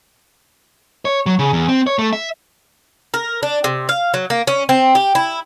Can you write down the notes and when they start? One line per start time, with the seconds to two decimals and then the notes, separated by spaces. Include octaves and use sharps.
1.05 C#5
1.26 F#3
1.39 C#3
1.53 E2
1.68 C4
1.87 C#5
1.99 A3
2.13 E5
3.14 A#4
3.43 D4
3.64 C3
3.89 F5
4.14 F#3
4.30 A#3
4.47 C#4
4.69 C4
4.95 G4
5.15 E4